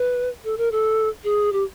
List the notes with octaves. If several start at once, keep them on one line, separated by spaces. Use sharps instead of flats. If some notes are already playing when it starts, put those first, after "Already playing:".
Already playing: B4
A4
A#4
A4
G#4
G4